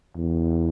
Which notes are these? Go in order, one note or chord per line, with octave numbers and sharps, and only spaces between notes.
E2